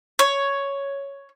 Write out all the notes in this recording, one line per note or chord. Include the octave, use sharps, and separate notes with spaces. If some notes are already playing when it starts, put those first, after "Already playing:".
C#5